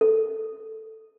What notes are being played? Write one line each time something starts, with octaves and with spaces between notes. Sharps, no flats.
A4